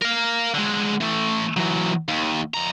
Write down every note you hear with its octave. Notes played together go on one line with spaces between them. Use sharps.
A#4 F5
D3 G#3
E3 A3
E3 F#3
D#2
F2 A#5